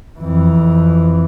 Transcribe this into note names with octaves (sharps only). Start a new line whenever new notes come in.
F2 E3